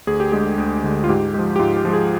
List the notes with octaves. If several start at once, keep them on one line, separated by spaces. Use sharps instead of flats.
D2 G#4
G4
D3 G#3 G#4
D2
D3 G#3
F4
G#2 G4
F3 G#3 G4
G4
G#2 F4
G4
F3 G#3
G#4